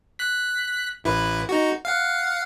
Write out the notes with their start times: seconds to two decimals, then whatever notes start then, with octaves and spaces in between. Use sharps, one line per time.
0.19 F#6 B6
1.04 A1 E4 B4
1.49 D#4 F#4
1.85 F5 F#5